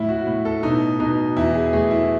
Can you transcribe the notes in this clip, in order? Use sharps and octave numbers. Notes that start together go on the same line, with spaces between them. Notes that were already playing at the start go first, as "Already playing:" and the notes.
Already playing: A2 E4
F#4
A2
A4
B2 D#4
B2 D#4
E2 E4
G#4
A3 G#4
E4